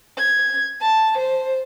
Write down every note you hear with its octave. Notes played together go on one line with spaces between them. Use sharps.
G#6
A5
C5